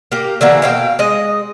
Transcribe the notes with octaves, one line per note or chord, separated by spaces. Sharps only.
A#3 G4
D3 E3 A#3 F#4
B2 F5 G5
G#3 D#5